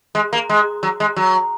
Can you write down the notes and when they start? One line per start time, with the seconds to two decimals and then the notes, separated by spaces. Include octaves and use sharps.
0.15 G#3
0.33 A#3
0.49 G#3
0.83 F#3
1.00 G#3
1.16 F#3